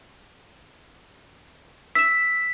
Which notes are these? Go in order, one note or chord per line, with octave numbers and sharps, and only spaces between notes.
E6 B6 E7